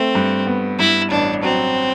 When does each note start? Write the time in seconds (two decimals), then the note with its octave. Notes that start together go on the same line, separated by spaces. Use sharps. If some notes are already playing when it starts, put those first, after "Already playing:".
Already playing: A3 C4
0.15 G2
0.47 B3
0.79 G2 E4
1.11 A1 D4
1.43 F#3 C4